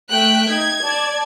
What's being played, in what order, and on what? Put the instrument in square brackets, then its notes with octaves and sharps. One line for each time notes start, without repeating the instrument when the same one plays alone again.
[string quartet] A3 E5 [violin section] G5 F#6
[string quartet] D#4 [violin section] G#6
[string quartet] D5 A5